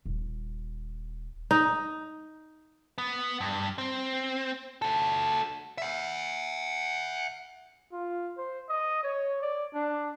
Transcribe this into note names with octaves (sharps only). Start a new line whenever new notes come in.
D#1
D#4
B3
G2
C4
F#4 A4
E5 F#5
F4
C5
D#5
C#5
D5
D4